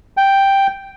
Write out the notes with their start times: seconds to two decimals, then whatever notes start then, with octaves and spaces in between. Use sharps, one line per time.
0.17 G5